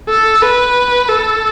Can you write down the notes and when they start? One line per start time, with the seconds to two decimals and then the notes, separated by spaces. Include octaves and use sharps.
0.09 A4
0.42 B4
1.09 A4